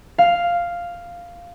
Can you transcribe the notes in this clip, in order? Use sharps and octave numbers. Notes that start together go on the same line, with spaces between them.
F5